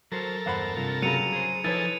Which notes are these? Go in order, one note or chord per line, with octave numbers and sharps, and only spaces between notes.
F#3 A4 A#4 C5
E2 G2 C5 F5 F#5 B5
G2 C3 F4
C#3 F#3 C#7 D#7 F7
G#4 C5
F3 D#4 E4 G#4 A4 B4 C#5 A6